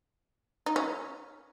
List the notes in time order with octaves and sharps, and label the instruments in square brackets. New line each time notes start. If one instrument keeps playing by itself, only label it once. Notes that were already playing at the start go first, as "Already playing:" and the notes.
[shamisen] D#4
C#4